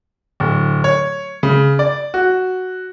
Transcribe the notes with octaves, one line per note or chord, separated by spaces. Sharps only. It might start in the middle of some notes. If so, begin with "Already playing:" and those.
D1
C#5
C#3
D5
F#4